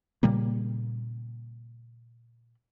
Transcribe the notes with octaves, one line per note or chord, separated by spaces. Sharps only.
A#2 C#3 G3 A#3